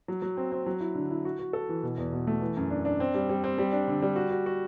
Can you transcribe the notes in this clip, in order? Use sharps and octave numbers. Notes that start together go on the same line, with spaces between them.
F#3
F#3
C4
C4
F#3
E4
D3
E4
F#4
F#4
A4
E3
B2
E2
B2
A3
E3
F#2
D4
D4
C4
G3
G3
C4
G3
D4
D3
G3
F#4
F#4
F#4